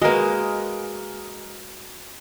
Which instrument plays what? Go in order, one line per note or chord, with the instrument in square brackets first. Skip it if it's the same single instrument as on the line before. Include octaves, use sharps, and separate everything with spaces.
[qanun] G#3 A#3 [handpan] F#4 G#4 B4 [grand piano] A#4 D#5